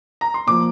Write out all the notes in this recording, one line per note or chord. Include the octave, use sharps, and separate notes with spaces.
A#5
C6
A#2 F3 A#3 D6